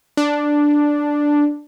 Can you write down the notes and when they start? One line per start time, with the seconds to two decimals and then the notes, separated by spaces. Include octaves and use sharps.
0.17 D4